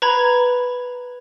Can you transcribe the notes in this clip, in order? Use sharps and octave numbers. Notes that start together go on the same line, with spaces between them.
B4 A#5 B5 G#6